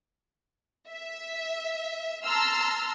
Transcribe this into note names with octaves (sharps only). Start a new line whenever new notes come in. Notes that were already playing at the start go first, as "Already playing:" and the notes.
E5
A5 A#5 C6 E6 F6